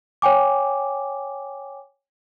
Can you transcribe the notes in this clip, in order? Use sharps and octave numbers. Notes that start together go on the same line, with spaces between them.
C#5 G5 G#5 D6